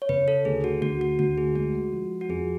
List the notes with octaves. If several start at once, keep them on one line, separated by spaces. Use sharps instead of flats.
C#5
C#3 B4
A4
D2 G#4
F#4
D2 F#4
F#4
D2 F#4
G#4
G#3 F#4
F3
F#4
F2 G#4